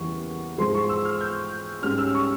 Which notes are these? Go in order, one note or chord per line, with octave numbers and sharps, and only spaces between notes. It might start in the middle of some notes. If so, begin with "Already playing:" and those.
Already playing: E2 C#3 E3 G3 A#3 C#6
G#2 F3 G#3 C6
C#6
E6
F6
G6
G#2 G3 C#4 F6
E6
C#6